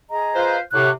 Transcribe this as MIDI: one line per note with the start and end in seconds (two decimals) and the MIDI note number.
0.10 0.56 68
0.10 0.56 75
0.10 0.56 82
0.35 0.59 65
0.35 0.59 71
0.35 0.59 72
0.73 0.89 45
0.73 0.89 48
0.73 0.90 78
0.73 0.90 85
0.73 0.90 90